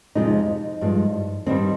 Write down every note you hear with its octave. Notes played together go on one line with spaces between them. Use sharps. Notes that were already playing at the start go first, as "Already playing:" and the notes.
F2 C3 F3 G#3 D#4
G2 F3 G#3
G2 D#3 G3 C4